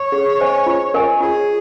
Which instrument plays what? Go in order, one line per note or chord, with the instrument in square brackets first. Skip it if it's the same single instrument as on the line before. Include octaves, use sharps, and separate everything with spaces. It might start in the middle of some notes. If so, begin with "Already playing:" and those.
Already playing: [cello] C#5
[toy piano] G#4
C5 D#5 G#5
F4
A#4 D#5 G#5
[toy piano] F4 [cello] G#4